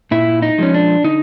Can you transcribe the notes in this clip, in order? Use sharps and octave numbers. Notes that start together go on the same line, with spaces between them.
A#2 E4
D#4
F3 G#3 C#4
D4
D3 D#4